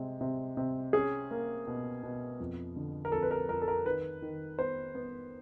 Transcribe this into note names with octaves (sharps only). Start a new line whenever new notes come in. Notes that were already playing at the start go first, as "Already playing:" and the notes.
Already playing: C3 G#3
C3
C3
C#4 G#4
A#3
B2
B2
F2
D3
A#4
F2 A4
B4
A#4
F2 A#4
A4
A#4
D#3 B4
D#3
B3 C5
B3